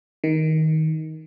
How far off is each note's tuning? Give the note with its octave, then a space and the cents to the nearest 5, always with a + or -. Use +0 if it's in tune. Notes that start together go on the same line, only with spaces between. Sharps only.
D#3 +15